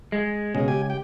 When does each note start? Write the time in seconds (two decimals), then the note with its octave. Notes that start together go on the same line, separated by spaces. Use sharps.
0.12 G#3
0.55 C#2 B2 C#4 G#4
0.68 G4 G#5
0.90 G4 G5